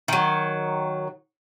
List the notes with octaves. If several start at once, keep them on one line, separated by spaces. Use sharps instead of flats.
D#3 F#3